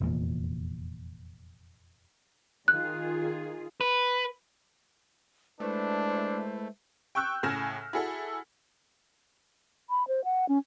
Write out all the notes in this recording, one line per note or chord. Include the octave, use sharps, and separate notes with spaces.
F1 E2 G2 A#2
D#3 F4 G#4 F#6
B4
G#3 A3 D4 E4 B4 C5
G5 C#6 E6 F#6 G6
A2 C#3 G#5 F6 A#6 E7
E4 F#4 G#4 A4
B5
C5
F#5
C#4